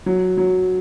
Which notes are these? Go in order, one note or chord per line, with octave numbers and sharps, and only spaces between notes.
F#3
F#3